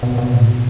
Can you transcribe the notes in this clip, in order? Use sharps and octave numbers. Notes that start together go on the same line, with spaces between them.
B2
B2
A2
B2